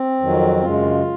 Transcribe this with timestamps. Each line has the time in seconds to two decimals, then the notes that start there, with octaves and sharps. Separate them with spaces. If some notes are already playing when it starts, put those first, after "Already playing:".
Already playing: C4
0.21 F2 D#3 F#3
0.61 F#2 C#3 G#3 F4